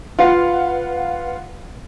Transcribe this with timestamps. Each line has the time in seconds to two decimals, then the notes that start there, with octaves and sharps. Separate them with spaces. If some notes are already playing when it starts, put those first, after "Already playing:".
0.19 F4 B4 F5 F#5